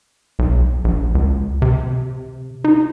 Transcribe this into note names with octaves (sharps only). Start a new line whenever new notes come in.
B1
A#1
C#2
C3
D#4